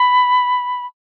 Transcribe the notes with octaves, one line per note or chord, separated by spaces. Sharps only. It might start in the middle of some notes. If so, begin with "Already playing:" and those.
Already playing: B5